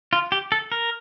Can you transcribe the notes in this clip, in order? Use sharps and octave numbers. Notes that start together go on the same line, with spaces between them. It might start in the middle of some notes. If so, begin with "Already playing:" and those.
F4
G4
A4
A#4